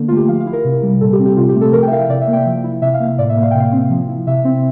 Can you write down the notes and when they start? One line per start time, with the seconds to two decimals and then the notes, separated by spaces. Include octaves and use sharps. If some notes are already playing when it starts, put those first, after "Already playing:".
Already playing: D3 A#3
0.08 A3 F4
0.17 G4
0.28 F3 F5
0.40 F5
0.46 E4
0.53 A#4
0.64 C3
0.83 G3
1.01 A#2 A4
1.13 G4
1.19 C4
1.25 G4
1.37 C3 F4
1.49 G4
1.55 A3
1.61 A4
1.73 F3 A#4
1.83 G5
1.88 E5
1.92 E4 F5
2.00 E5
2.09 C3 D5
2.21 E5
2.28 A#3
2.33 G5
2.46 F3
2.64 E4
2.82 C3 E5
2.94 F5
3.00 A#3
3.06 F5
3.18 A2 D5
3.29 E5
3.36 A#3
3.43 F5
3.51 C3 G5
3.60 F5
3.72 C4
3.90 F3
4.09 E4
4.27 C3 E5
4.45 C4